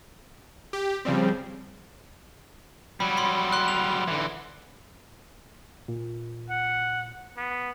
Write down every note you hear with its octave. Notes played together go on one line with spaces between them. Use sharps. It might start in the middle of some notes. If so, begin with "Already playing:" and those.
G4
C#3 F3 G3 C4
F#3 G3 B5
B5 C6
C6 F#6
F7
D3 E3
A#2
F#5
B3